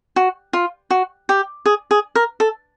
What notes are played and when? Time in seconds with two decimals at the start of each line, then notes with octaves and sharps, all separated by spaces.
0.16 F#4
0.53 F4
0.90 F#4
1.29 G4
1.66 G#4
1.91 G#4
2.15 A#4
2.40 A4